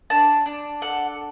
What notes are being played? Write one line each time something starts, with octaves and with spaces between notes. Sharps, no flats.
D4 A5
D4
A4 F#5